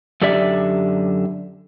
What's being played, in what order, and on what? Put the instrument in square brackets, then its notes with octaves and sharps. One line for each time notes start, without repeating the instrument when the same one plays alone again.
[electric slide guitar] F#2 D3 G4 D5 E5